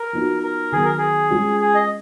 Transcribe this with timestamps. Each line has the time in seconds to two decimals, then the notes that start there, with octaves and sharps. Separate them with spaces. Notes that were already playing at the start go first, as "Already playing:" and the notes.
Already playing: A#4
0.13 F3 B3 D#4 F#4
0.43 A#4
0.72 D#3 F#3 B3 G#4
0.84 A#4
0.98 G#4
1.31 G#3 C#4 F4
1.60 G#4
1.75 D#5